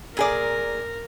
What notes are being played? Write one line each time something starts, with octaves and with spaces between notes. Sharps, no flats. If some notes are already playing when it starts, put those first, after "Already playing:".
A#2 G#4 A#4 D5